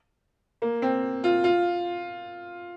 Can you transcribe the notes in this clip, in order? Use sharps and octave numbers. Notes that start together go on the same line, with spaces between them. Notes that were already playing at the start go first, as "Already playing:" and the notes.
A#3
C4
F4
F4